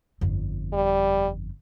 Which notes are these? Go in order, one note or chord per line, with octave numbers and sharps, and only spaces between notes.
G1 F2
G3